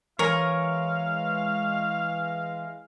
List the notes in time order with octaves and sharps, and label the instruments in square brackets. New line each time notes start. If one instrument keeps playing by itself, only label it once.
[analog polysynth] E3 G#3 [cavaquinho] A#4 [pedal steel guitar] C#5 G#5 [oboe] F5